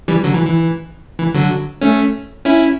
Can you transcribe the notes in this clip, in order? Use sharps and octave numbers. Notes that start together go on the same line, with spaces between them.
E3 G3
D3 F#3
E3
E3
E3
D3 F#3
A3 C#4
C#4 E4